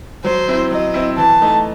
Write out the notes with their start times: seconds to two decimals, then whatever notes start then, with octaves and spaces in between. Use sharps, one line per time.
0.24 F#3 C5
0.48 C4 E4
0.71 F#3 D#5
0.94 C4 E4
1.17 E3 A5
1.42 A3 D#4